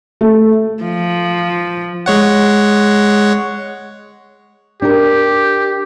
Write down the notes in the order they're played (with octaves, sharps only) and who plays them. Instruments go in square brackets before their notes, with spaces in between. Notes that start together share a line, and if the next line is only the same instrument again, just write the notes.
[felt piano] A3
[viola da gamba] F3
[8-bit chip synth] G#3 C#5 F#5
[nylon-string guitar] D4 A#4 [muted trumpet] G4